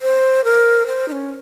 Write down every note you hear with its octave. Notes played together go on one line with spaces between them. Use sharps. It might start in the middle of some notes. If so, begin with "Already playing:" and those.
C5
A#4
C5
D#4
C#4